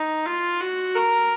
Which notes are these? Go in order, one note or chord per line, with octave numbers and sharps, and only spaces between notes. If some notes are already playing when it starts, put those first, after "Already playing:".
Already playing: D#4
F4
F#4
A#4